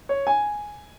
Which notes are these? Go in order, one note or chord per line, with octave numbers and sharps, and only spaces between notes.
C#5
G#5